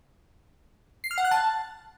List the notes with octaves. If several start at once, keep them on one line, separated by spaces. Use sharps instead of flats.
C7
F6
F#5
F#6
A5